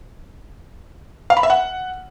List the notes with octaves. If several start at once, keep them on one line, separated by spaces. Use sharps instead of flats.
F5
B5
E5
F#5